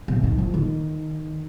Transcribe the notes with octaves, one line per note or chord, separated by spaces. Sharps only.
C3
D#3
F3
D#3